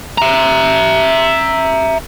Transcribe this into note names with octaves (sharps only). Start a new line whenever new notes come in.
E5 A#5